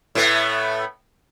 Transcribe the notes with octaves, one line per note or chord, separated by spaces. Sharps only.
A2 A3 B3